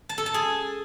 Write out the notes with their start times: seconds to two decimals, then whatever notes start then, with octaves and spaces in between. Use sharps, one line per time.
0.09 A5
0.18 A4
0.26 A5
0.34 G#4